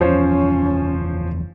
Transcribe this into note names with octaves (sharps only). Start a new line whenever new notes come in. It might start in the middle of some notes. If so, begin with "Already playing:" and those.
F#1 E2 E3 F3 C#4 C5 C#5